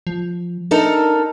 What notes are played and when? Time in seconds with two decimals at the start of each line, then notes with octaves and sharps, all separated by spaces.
0.07 F3
0.71 D4 D#4 A4 A#4